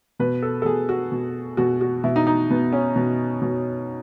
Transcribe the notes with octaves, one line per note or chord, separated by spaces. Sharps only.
B2 B4
A4
A4
B2 G#4
F#4
B2
B2 F#4
F#4
B2 E4
D#4
D#4
B2 B3
C#4
B2
B2